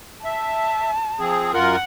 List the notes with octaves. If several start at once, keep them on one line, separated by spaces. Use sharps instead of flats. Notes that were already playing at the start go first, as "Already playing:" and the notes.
E5 A5
F3 C4 G#4
F#2 F4 A#4 F#5